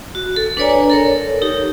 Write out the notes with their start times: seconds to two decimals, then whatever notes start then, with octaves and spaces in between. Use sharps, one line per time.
0.15 F#4
0.36 A4
0.57 D4 B4 C#5 D5 G#5 A#5
0.90 A4 A#4 C#5
1.42 D#4 G4